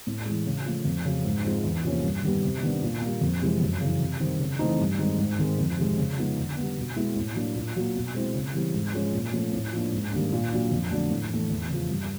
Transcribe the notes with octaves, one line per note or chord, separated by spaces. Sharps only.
A2
E3 G#3
C#3
F3 A3
F2
C#3 F#3
G#2
F3 G#3 C4 D#4
E2
C3 F3 A#3 C#4
G2
D#3 G3 B3
C3
D#3 G3 B3 D4
A#2
G3 A#3
F2
C3 E3 G#3
F#2
C#3 E3
C3
D#3 G3 C4
C#3
E3 A3 C4 D#4
G2
D#3 G#3 C4 D#4
G#2
D#3 G#3 C4
F2
C3 D#3 G#3
C#3
F3 G#3 B3 D#4
D3
G3 B3
B2
G#3 B3 E4
A2
F#3 A#3 D4
A#2
F#3 A#3
B2
G#3 C4 E4
C#3
E3 G3 C4
G#2
F3 G#3 C#4
A#2
F3 A3 C#4
A2
F3 A#3 D4
G#2
D#3 G3 A#3 D4
A#2
F#3 A#3 D4
F2
D3 F#3 A3 D4
A2
E3 A3
E2
C#3 F3
G2